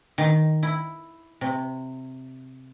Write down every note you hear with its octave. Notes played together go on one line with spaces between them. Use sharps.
D#3
E4
C3